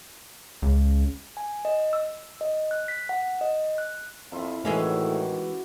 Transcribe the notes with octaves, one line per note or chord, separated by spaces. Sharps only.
C#2
G#5
D#5
E6
D#5
F#6
B6
F#5
D#5
F#6
F2 F3 E4 F4
A2 D#3 E3 G#3 C#4 F#4 G4